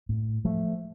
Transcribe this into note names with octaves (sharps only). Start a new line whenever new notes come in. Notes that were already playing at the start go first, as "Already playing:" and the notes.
A2
F3 A3